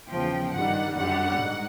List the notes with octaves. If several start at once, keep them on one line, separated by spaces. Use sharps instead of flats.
E2 C#3 F3 G5
G2 D#3 G3 F#5
F#2 D3 G3 F#5
G#2